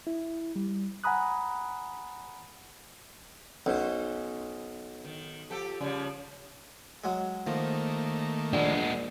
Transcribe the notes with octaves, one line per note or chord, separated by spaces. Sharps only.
E4
G3
F#5 G#5 A#5 B5 D#6 F#6
B1 C#4 D#4 C5
D#3
F3 G4 A4
C#3 F3 G3
F#3 G#3
D#3 F3 A3 A#3
A#1 G#3 B3 D4